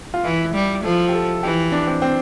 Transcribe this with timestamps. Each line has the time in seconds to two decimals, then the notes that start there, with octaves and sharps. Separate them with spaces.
0.14 F4
0.24 E3 E4
0.54 G3
0.84 F3 A4
1.09 G4
1.13 A4
1.43 E3 G4
1.72 D4
1.87 C4
2.02 C4